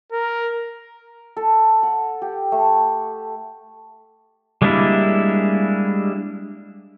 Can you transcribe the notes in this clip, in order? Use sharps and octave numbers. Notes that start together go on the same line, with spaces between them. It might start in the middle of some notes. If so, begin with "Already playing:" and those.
A#4
A4
F#5
G4
A3
G3 G#3 A#3 D4 E4